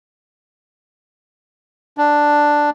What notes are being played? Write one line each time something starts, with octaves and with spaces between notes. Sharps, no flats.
D4